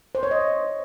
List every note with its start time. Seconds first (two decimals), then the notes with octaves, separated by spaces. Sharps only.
0.15 C5
0.23 C#5
0.31 D#5